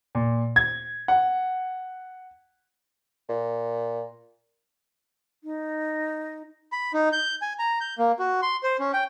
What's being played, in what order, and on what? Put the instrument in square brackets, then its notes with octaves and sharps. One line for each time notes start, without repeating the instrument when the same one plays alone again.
[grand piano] A#2
G#6
F#5
[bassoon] A#2
[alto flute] D#4
[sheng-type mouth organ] B5
D#4
G6
G#5
A#5
G6
A#3
F#4
C6
C5
C#4
G5